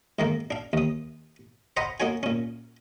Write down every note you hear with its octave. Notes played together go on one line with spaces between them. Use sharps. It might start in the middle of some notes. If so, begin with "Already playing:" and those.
G#2 D#3 A#3
D4 F5
D#2 D#6
C5 D#5 F5 F#5 A#5 B5
A#3 D#4 F#4 C#5 G#5
A#2 C#4